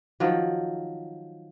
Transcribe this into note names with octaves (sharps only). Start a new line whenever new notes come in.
D#3 F3 F#3